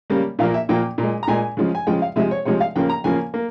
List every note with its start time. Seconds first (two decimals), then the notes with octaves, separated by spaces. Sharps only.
0.10 C#3 G3 A#3
0.39 A#2 F3 A#3 F5
0.54 E5
0.69 A#2 F3 A#3 G5
0.98 A#2
1.03 G#3
1.23 A#5
1.28 A#2 G#3 G#5
1.57 C#3 F3 G#3
1.75 G#5
1.87 C#3 F3 G#3 G5
2.02 F5
2.16 C3 F3 G#3 E5
2.31 C#5
2.45 C3 F3 G#3 C#5
2.60 F5
2.76 C#3 F3 A#3 G5
2.89 A#5
3.04 C#3 F3 A#3 G#5
3.34 A#3